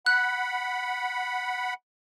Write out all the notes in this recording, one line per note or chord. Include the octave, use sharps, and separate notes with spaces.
F#5 B5 F#6